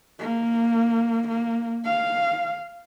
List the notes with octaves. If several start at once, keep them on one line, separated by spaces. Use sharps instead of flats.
A#3
A#3
F5